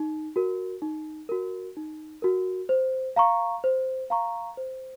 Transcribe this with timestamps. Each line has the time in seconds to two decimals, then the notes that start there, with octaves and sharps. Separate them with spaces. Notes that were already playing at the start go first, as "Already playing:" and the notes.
Already playing: D#4
0.36 F#4 A#4
0.82 D#4
1.29 F#4 A#4
1.77 D#4
2.22 F#4 A#4
2.69 C5
3.16 F5 A#5 C#6
3.64 C5
4.10 F5 A#5 C#6
4.57 C5